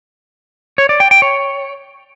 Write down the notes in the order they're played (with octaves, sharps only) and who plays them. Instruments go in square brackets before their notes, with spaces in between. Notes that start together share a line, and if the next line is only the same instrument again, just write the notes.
[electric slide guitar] C#5
D5
G5
G5
C#5